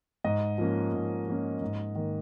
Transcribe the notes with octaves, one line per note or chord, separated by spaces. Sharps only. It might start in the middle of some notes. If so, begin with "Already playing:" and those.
G#2 D#5
F3 A#3 C#4
G#2
F3 A#3 C#4
G#2
D#3 A#3